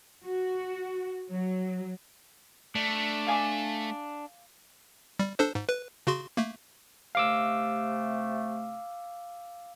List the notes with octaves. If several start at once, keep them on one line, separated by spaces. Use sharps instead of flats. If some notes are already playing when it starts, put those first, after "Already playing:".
F#4
F#3
A3 D4
F5 G#5 D6
G3
D4 A4 C5
G#2
B4
C#3 F#4 C6
A3 A#3
C3 A3 F5 D6 E6